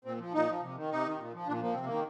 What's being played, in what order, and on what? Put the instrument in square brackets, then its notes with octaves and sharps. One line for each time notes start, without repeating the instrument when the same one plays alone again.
[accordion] A#2 C4
F3
A#2 D#4
F3
C3
D#3
C3 D#4
D#3
A#2
F3
A#2 D4
F3 A#3
C3 C4
D#3 A#3